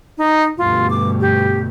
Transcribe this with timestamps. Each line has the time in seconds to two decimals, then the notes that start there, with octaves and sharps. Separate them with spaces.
0.18 D#4
0.58 D2 G2 B2 F4
0.90 D6
1.20 G4